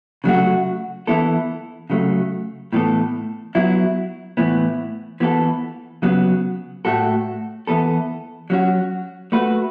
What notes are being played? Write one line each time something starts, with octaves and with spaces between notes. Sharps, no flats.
C#3 F#3 A3 F#4
E3 B3 E4 A4
C#3 F#3 A3
A2 E3 B3 A4
F#3 B3 E4
A2 E3 B3
E3 B3 F#4 A4
C#3 F#3 B3
A2 A3 F#4 A4
E3 B3 A4
F#3 C#4 F#4
A3 F#4 B4